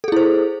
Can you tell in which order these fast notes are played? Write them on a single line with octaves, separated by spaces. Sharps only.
A4 G#4 E4 C5